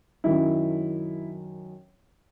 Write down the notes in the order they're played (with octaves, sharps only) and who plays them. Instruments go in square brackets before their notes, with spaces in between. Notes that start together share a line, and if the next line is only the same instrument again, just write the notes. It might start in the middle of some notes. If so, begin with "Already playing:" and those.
[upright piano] F#2 D#3 F#3 E4